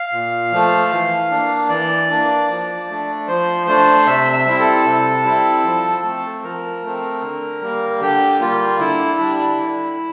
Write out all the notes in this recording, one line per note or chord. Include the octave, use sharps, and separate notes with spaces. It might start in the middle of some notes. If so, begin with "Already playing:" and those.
Already playing: F5
A#2
F3 A3
E3
A#3 D4
E3 D5
A#3 D4
F3
A3 D4
F3 C5
A3 D4 C5
C3 E5
E5
G3 C4 E4
A4
C3
G3 C4 E4
F3
A3 C4
F3 A#4
A3 C4
D3
G3 A#3
D3 G4
G3 A#3 F4
D3 E4
G3 D4
D3